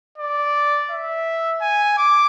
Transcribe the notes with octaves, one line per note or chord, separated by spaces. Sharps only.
D5
E5
G#5
D6